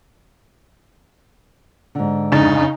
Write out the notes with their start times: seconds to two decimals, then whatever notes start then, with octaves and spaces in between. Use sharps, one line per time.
1.95 G#2 D3
2.32 F2 C#3 D4 D#4 A6